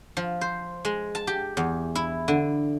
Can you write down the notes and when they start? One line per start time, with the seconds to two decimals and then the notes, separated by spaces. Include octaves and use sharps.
0.17 F3
0.41 C5
0.85 G#3
1.15 A5
1.27 G4
1.57 E2
1.95 E4
2.28 D3